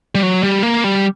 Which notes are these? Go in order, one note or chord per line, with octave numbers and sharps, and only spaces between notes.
G3
F#3
G3
A#3
G3